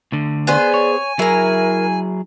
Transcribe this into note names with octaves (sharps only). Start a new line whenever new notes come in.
D2 D3
B3 G#4 C5 D5 G#5
C#5
F#3 E4 G#4 A#4 A#5